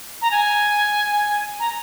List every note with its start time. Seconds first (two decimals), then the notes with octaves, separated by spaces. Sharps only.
0.22 A#5
0.31 G#5
1.60 A#5